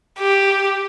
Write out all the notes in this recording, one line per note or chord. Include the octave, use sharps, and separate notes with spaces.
G4